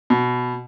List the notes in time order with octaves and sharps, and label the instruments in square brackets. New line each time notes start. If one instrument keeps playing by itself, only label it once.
[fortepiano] B2